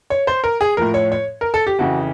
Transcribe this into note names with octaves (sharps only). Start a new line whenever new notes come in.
C#5
C5
A#4
G#4
A2 F3 A#4
C#5
C#5
A#4
A4
G4
F2 C#3 E3 F#4